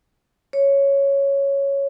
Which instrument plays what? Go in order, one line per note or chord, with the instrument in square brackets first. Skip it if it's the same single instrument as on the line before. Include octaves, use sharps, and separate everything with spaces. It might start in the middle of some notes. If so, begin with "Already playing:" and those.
[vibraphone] C#5